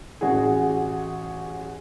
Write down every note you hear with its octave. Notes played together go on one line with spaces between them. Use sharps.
A1 F#4 G#4